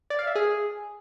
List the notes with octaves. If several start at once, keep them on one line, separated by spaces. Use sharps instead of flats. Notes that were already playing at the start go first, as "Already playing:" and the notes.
D5
F5
E5
G#4